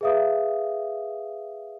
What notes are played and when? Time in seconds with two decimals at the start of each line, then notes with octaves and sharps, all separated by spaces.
0.01 G#4 B4 E5 F5 D#6